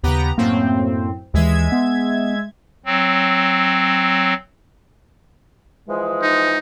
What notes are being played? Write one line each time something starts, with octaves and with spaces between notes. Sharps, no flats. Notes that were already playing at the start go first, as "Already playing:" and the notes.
D#2 C#3 B3 G4 A#5
F#2 A2 A#3 C4
D#2 E3 G#3 E5 G#6
B3
F#3 C4
E3 F3 G#3
D#4